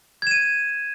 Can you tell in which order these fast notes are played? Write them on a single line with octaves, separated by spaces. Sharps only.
G#6 E7 D#7